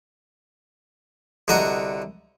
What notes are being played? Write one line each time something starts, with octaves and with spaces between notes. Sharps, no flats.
C2 D3 F#4 D#5 A#5